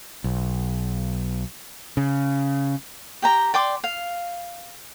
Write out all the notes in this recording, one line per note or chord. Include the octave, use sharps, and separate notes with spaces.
B1
C#3
G4 G5 A#5
D5 G5 C6 D6
F5